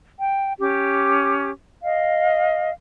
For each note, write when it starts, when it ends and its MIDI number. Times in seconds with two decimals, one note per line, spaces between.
0.18 0.52 79
0.60 1.50 61
0.60 1.50 67
0.60 1.50 86
1.83 2.71 75
1.83 2.71 77